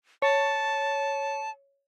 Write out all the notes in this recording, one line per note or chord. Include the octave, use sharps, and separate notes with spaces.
C#5 A5